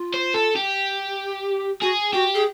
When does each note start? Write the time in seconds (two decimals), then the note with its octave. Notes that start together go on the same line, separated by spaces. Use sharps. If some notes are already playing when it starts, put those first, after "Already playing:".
Already playing: F4
0.14 C5
0.34 A4
0.56 G4
1.82 F#4 G#4
2.13 F#4 G4
2.35 G#4